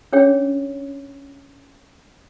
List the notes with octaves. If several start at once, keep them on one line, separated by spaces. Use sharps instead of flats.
C#4 D4 G#4 C#5 G5